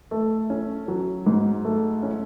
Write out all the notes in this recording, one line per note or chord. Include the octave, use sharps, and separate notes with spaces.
A3
C#4
F#3
G#2
A3
C#4